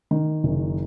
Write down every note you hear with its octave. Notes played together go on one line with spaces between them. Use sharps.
D#3
F#1